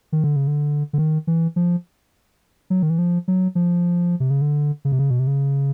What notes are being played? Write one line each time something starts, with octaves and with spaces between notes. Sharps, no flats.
D#3
D3
C#3
D3
D3
D#3
E3
F3
F#3
D#3
E3
F3
F#3
F3
C3
C#3
D3
C#3
C3
C#3
B2
C3
C#3